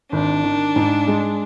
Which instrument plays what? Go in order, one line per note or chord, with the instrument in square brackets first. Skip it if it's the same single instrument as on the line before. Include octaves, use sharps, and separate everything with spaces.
[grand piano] G#1 [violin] D4
[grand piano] D#3
G#2
G#3